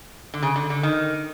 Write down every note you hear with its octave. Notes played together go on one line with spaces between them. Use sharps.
D3
C#3
D3
D3
D#3